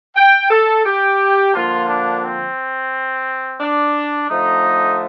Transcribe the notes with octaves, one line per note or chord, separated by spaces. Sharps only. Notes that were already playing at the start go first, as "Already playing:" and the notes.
G5
A4
G4
D3 F3 A#3 F4
D4
C4
D4
D3 F3 A3 D#4